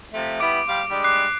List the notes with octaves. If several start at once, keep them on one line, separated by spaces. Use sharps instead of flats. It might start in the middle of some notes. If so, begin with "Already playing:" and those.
C3 F3 A3
G3 B3 E4 D6 D7
G3 C5 F5
G3 G#3 D4
D6 F#6 C7